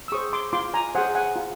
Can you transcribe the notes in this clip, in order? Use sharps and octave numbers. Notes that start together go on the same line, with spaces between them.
E6
G#4 C5 C#6 D#6
C6 D6
F4 C6 D6
G#5 A#5
G#4 C5 F#5 G#5
F#5 G#5
F4